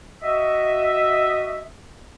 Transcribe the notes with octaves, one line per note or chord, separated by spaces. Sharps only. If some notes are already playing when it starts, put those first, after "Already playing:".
F#4 D#5 E5